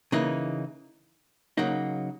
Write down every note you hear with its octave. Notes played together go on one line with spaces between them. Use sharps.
C#3 E3 A#3 D#4
C#3 F#3 A#3 D#4